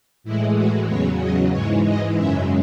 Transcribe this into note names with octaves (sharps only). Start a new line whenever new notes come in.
A2 E3 G#3 E4
F#4
E2 C#3 F#3 C#5
D#5
G#2 E3 G#3 C#5
D#5
F#2 C#3 G#3 E5